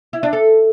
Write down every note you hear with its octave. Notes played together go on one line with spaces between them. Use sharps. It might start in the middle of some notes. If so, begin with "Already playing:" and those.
E4
D4
A4